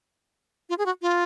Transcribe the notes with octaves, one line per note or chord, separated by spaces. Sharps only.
F4
G#4
F#4
F4